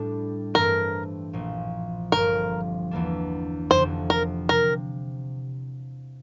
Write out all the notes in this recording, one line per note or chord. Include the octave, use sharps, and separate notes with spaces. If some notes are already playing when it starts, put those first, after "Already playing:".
Already playing: A2 G3 D4
G2 E3 A3 C4 A#4
A#1 A#2 F3
G1 G2 F3 C4 A#4
E2 E3 A#3 D4
F1 F2 D3 C5
A#4
C3 A#4